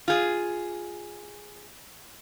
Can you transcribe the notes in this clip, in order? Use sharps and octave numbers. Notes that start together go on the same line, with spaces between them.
F4 G#4